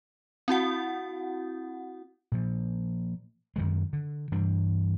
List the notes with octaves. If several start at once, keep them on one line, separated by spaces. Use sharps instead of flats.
C4 E4 F#4 F#5
A#2 F3
F#2 D#3 G#3
D3
G2 E3 G3 D4